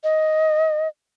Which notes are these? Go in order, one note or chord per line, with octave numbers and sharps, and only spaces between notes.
D#5